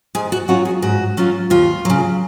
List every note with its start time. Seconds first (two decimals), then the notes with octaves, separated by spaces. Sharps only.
0.15 G#2 G#4
0.32 F#4
0.48 F#3 C#4 F4 F#4
0.65 G#4
0.82 G#2 F#4
1.17 F#3 C#4 F4
1.50 D#2 F4
1.85 C#3 F#3